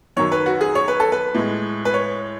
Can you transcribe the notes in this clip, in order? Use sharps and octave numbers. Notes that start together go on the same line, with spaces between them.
F#2 D#3 F#3 C#5
B4
F#4
G#4
C#5
B4
A4
B4
A2 G#3
B4
C#5